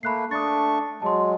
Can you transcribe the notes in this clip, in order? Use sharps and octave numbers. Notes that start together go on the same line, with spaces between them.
A3 A#3 B5 F#6 C7
A3 D4 C#6 D#6 A6
F#3 G#3 A5 C6